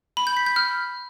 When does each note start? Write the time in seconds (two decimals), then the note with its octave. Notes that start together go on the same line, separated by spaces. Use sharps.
0.17 B5
0.27 G6
0.37 B6
0.46 G6
0.56 F6